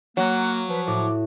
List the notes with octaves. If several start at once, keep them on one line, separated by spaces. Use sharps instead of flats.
F#3 A#3 F#5
F3 B4
A2 D6